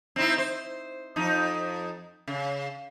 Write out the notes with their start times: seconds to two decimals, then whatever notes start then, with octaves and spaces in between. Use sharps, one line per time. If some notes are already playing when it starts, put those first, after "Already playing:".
0.16 C4 D#4 E4
0.38 C5
1.16 F2 D#4
2.28 C#3